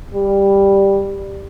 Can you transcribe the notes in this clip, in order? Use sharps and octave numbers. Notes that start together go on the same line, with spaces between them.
G3